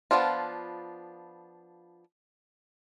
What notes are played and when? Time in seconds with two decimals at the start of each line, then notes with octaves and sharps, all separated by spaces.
0.11 F3 A3 B3 D4 F4